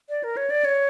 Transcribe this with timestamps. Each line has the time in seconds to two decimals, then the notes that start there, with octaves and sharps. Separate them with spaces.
0.09 D5
0.24 A#4
0.37 C#5
0.50 D5
0.65 C#5